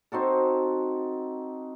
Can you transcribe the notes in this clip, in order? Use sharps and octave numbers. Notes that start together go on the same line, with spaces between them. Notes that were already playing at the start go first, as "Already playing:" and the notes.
C4 D#4 F#4 A4